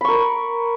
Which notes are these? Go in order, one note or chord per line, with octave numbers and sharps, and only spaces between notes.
A#4 B5 C#6